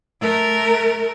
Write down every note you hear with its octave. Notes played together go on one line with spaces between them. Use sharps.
A3 A#4